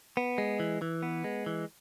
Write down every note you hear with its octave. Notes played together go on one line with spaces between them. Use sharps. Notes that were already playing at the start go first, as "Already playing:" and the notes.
B3
G#3
E3
E3
B3
G#3
E3